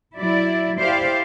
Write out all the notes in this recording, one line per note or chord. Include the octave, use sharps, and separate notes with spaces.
F#3 E4 D5
E4 G4 C5 D5 F5